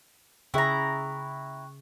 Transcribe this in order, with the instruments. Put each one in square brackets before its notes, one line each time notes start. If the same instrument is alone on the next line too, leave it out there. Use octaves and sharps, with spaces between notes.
[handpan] C#3 G#4 E5 [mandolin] E4 A#5 [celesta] G5 C#6 F#6